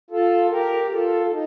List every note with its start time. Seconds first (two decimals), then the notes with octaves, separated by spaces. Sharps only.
0.10 F4 A4
0.51 G4 A#4
0.84 A#4
0.91 F4 A4
1.26 A4
1.31 D#4